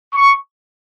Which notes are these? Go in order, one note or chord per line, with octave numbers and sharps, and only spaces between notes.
C#6